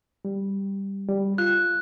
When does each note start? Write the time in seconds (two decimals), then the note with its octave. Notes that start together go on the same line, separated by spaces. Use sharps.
0.25 G3
1.09 G3
1.38 F4 F#6